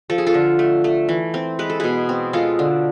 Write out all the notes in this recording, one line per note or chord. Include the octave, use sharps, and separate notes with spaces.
F3 A4
G#4
F4 A4
D3
A3
A3
E3
C4
G#3 B4
A4
B2 G#4 B4
C4
G#3 F4 A4
D3